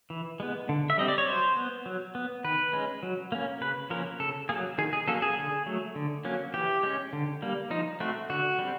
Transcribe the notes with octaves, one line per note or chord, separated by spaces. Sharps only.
E3
G#3 B3
D3
E5
G3 C4 D#5
D5
C#5
F#3 C5
B3
F#3
B3
D#3 B4
G#3 C#4
F#3
A#3 C#4
C#3 B4
F3 A#3 C#4 A#4
C#3 A4
F#3 A#3 G#4
D#3 G#4
G#4
F#3 A#3 C#4 A4
G#4
D3
F#3 A3
D3
F#3 A#3 C#4
E3 G4
G#3 C#4
D3
G3 A#3
F3 D#4
A3 C4 F#4
D3 F#4
G3 C4